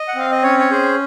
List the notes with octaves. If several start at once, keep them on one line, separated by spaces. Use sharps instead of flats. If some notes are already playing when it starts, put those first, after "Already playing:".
Already playing: D#5
F#5
C4 F5
D#5
C#4 C#5
C#5
G#4 C5